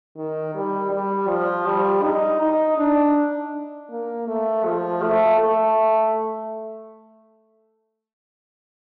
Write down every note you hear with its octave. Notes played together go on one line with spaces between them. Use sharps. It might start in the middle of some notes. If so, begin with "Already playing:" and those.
D#3
G3
G3
F3
G3
D#4
D#4
D4
A#3
A3
F3
A3
A3